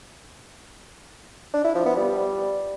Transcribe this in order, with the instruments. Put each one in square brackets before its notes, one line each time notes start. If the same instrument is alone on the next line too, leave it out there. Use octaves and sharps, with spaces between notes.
[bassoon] D4
E4
F3
B3
G3